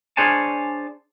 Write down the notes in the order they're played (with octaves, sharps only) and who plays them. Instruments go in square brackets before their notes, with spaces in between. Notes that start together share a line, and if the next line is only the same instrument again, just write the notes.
[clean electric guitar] D4 G#4 C5 C#5 G#5 A5